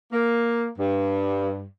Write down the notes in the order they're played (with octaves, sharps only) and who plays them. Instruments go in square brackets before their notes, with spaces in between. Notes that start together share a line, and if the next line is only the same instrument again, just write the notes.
[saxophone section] A#3
G2